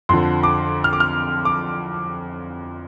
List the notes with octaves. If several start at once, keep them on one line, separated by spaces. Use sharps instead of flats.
F2 D3 F3 C6
D6
F6
D6
F6
D6